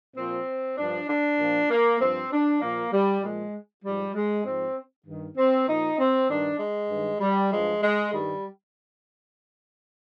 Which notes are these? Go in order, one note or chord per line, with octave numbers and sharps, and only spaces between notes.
A#2 F3 C4
G2 F3 D4
D4
A#2 F3
A#3
G2 F3 C4
D4
A#2 F3 A#3
G3
A#2 F3 G#3
G#2 F3 G3
G#3
G#2 F3 C4
G2 D#3
C4
A#2 F3 D#4
C4
G2 D#3 D4
G#3
G2 D#3
G3
F3 G#3
G2
G#3
G2 D#3 G3